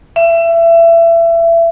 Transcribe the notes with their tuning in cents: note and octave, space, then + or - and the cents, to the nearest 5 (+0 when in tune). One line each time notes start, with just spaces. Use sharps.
E5 +25